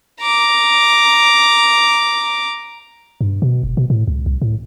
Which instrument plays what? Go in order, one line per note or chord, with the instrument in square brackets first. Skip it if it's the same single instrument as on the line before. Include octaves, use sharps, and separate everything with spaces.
[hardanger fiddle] A#5 D6
[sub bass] G2
B2
F1
B2
A2
C#2
C2
A2